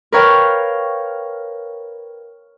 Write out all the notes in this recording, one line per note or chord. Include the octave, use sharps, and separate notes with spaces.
A#4 B4 C#5 F5 G5